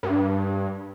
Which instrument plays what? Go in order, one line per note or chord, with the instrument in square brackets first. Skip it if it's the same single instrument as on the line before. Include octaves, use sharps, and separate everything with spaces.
[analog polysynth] G2